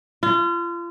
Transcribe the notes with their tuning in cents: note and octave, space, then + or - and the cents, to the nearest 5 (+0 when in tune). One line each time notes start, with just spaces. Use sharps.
F4 -35